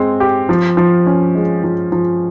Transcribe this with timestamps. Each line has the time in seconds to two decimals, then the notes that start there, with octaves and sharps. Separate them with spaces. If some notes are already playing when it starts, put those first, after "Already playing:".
Already playing: G#3 C4
0.20 G4
0.49 F3
0.77 F3
1.06 C#4
1.35 G#3
1.64 F3
1.92 F3